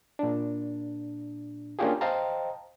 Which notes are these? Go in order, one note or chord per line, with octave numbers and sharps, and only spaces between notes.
A#2 D4
A#3 C#4 D4 F4 G4 G#4
C5 D#5 F5 G5 A5 A#5